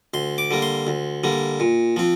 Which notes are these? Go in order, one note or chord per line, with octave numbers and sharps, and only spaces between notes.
D2 C6
D6
D3 G3 A#3
C6
D2
D3 G3 A#3
A#2
F3 C4